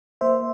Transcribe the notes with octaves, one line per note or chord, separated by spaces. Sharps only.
A#3 C5 E5